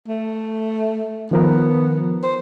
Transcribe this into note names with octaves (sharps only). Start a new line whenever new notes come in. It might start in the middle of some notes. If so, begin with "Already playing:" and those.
A3
D#3 F3 B3 A#4
C5